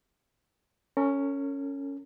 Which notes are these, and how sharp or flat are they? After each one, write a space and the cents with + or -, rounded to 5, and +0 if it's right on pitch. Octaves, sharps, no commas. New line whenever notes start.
C#4 +0 A#4 -45